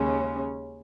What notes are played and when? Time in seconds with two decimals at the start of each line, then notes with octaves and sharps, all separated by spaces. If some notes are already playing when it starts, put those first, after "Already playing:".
Already playing: D#2 C#3 G#3 C#4